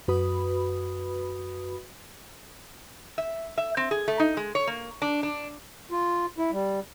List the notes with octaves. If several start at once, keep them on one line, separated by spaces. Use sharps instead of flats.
F#2 F#4 B4 B5 D#6
E5
E5
C4
G#4
A3
D#4
G#3
C#5
A#3
D4
D4
F4
E4
G3